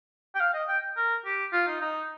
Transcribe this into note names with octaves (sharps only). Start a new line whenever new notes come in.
G5
F5
D#5
G5
A#4
G4
F4
D#4
D#4